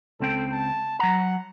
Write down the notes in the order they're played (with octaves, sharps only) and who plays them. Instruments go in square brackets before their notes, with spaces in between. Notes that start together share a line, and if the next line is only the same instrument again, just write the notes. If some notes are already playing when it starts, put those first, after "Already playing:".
[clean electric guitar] C#2 C4 G5 [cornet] A4
[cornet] A5
[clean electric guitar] F#3 A#5 [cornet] F#5